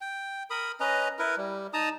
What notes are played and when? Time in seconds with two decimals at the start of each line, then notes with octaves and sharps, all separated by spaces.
0.01 G5
0.50 A#4 B5 D#6
0.80 C#4 B4 D#5 A#5
1.19 E4 A#4 B4
1.37 G3
1.74 D#4 A5 A#5 D#6